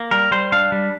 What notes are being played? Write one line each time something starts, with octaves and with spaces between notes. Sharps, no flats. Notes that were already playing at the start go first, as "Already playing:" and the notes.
Already playing: A#3
G3 A#4
G3 C5
D4 F5
G3